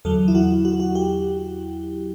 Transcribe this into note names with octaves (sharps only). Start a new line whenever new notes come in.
E2 D3 F#3 A4
E4
F#4
F#4
F#4
G4